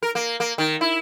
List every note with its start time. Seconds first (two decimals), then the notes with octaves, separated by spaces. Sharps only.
0.03 A#4
0.15 A#3
0.40 A#3
0.58 D#3
0.81 E4